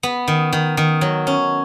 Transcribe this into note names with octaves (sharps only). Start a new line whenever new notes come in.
B3
D#3
D#3
D#3
F#3
C#4